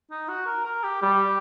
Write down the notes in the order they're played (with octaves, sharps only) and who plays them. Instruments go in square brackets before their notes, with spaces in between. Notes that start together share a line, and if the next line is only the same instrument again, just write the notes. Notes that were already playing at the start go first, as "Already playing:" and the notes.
[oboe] D#4
F#4
A#4
A#4
G4
[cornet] G3 [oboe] G4